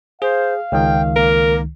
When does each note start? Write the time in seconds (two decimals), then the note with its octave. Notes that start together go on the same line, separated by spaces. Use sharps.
0.22 G#4 C5 F5
0.72 C#2 D#3 G5
1.16 A#3 A#4